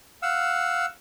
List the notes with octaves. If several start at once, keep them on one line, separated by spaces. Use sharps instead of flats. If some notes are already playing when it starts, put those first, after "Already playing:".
F5 F#5 E6